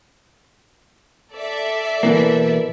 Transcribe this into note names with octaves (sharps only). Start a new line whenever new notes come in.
A4 D5 E5
B2 E3 A#3